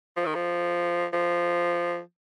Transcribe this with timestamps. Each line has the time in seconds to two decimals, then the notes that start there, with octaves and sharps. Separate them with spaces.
0.17 F3
0.26 D#3
0.35 F3
1.13 F3